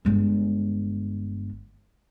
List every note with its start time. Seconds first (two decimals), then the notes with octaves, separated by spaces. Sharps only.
0.05 G1 G#3